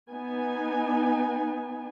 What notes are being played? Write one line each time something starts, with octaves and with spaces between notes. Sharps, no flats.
B3 D#4 G#5